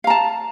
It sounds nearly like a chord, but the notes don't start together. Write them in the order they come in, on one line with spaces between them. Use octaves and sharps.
F5 A#5 A5